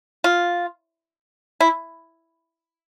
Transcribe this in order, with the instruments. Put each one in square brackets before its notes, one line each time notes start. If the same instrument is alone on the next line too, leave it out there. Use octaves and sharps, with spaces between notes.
[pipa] F4
E4